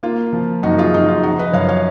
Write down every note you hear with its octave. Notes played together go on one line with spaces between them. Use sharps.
A#3 F4
F3
F#2 D#4 F#4
F4 G#4
F#2 D#4
F4
F3 D#4 F#4
B4 D#5
F#2 C#5 F5
C#5 F5